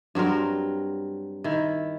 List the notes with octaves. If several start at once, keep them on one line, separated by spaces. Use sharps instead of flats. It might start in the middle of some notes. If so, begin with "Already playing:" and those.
G2 F#3 C4 A#4
D#3 E4